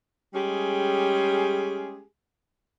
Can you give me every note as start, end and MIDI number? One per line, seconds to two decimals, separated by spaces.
0.34 2.03 55
0.34 2.03 56
0.34 2.03 61
0.34 2.03 67
0.34 2.03 68